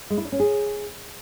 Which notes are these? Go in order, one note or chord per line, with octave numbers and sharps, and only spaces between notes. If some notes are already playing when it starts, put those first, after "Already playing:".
G#3
E4
D4
C#4
G#4